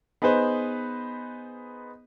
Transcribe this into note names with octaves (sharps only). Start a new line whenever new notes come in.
B3 D#4 G#4 B4 C5